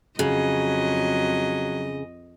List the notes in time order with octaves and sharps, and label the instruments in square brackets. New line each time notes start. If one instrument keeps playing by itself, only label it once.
[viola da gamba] F2 D#5 [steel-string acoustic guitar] C#3 [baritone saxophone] F#3